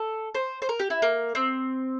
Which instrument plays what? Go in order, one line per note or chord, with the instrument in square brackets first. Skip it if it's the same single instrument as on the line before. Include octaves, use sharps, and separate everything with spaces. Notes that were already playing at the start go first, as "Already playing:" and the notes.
Already playing: [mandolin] A4
C5
C5
A#4
G4
E4
A#3
C4